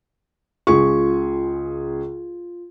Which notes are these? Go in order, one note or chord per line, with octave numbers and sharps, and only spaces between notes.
C#2 F4 G#4 C#6